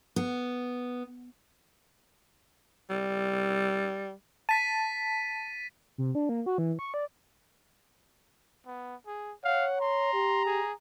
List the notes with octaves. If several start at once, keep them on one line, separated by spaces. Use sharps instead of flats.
B3
G3
A5 A6 B6 D#7
C3
D4
A#3
F#4
E3
C#6
D5
B3
G#4
C#5 F5 F#5
A#5 C6
G4
G#4